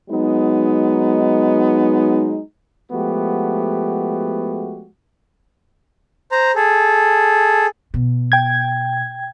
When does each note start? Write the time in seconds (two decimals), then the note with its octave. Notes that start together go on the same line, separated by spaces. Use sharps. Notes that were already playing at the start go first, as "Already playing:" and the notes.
0.10 F#3 G#3 B3 D#4
2.91 F3 G#3 A3 B3 F#4 G4
6.32 C5 A#5
6.55 G#4 A4
7.94 B2
8.32 G5 G#6